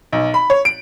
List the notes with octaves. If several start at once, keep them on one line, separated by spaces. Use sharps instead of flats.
B1
B5
C#5
D7